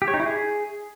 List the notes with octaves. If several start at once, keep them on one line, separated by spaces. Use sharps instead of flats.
G4
C#5
D#4
E4
G#4